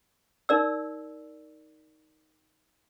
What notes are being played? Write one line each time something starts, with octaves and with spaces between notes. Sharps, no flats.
D#4 A#4 D5 E6